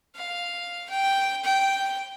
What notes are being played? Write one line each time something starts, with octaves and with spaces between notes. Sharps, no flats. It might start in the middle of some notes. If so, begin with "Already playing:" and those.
F5
G5
G5